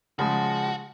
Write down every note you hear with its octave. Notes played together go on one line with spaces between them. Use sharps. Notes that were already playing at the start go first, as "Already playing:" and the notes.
C#3 F3 G#3 F#4